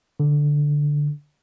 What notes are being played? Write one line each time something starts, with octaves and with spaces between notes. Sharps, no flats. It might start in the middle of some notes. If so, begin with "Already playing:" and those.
D3